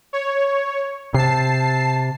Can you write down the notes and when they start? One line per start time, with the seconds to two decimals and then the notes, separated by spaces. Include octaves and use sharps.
0.13 C#5
1.14 C3 A5 C7